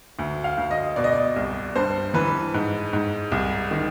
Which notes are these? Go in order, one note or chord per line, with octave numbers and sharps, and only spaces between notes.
D2
F5
D2
D#5
B2 D5
D#5
D5
C2
G2 C5
E3 B4
G#2
G#2
C2
D#3